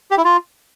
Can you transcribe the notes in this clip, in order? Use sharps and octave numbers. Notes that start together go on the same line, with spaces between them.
G4
E4
F4